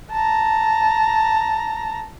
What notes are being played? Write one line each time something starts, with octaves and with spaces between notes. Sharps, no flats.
A5 A#5